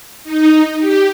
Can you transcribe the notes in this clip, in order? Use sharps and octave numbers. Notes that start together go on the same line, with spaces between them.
D#4
G4